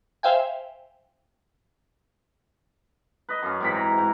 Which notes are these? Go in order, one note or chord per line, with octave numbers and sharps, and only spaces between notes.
C5 E5 F5 G5 G#5
B4 D#5
F#2 C#4
G#2 C3 E3 B5
A#5
G#2